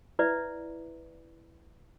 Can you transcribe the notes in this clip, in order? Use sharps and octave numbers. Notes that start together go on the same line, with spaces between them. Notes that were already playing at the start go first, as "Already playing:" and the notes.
E4 B4 D5 E5